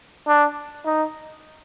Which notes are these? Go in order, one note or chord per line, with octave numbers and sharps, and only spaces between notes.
D4
D#4